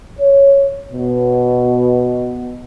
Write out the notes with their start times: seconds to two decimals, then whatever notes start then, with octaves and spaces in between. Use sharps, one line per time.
0.19 C#5
0.92 B2